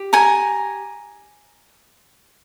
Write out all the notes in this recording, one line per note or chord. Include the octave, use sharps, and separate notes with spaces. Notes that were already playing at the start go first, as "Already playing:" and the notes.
Already playing: G4
G#5 A#5